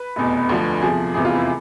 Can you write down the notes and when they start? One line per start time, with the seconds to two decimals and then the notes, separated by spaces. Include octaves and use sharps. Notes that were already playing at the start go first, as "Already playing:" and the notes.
Already playing: B4
0.16 F1 E2 B2
0.49 D2 D3 F3
0.82 E2 C3 F3 G#4
1.14 F1 E2 C3 E3 G#4
1.25 F4
1.35 E4